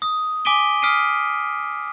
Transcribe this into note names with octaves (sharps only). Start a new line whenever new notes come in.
D#6
G#5 D6 B6 D7 D#7 G7
D#6 F6 B6 C7 D7 D#7